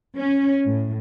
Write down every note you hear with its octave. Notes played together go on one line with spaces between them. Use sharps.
C#4
A2